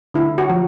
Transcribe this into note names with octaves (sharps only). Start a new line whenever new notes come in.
D3 E4
F#4
F3